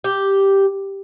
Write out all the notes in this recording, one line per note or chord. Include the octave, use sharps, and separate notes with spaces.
G4